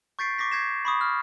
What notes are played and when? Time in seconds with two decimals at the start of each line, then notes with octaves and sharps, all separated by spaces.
0.19 C#6 G6 A6 B6 C7 D7
0.38 C#6 D6 G6 A#6 B6
0.52 G6 G#6 A#6 C7 E7
0.85 B5 C#6 D#6
1.01 F6